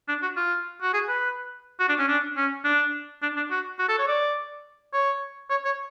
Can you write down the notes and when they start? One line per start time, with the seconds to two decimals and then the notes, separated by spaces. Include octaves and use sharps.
0.08 D4
0.22 F#4
0.36 F4
0.82 F#4
0.93 G#4
1.08 B4
1.79 F#4
1.89 D4
1.99 C#4
2.08 D4
2.36 C#4
2.64 D4
3.22 D4
3.36 D4
3.51 F#4
3.79 F#4
3.89 A4
3.99 C#5
4.08 D5
4.93 C#5
5.50 C#5
5.65 C#5